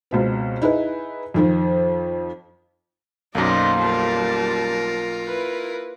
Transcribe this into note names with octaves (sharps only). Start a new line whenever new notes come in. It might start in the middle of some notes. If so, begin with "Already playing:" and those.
C#2 B2 C4
D#4 E4 G#4 B4
F2 D#3 F3
B1 F#2 A#3 D#4 A4 C5 D5 D#5
G3 F4 A#4 A5
E4 B4